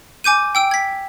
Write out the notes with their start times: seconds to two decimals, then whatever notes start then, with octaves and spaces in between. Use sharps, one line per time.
0.24 G#5 D6 G6 D#7
0.55 G5 E6 D7
0.71 G#6 B6